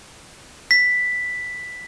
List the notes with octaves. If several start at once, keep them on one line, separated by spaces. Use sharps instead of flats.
B6